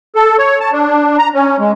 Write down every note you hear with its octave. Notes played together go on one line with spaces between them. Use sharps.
A4
C#5
A5
D4
A#5
C#4
G#3